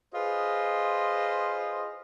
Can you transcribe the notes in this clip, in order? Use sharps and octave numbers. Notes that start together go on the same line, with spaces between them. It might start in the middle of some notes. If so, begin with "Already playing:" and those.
F4 G#4 B4 C5 D#5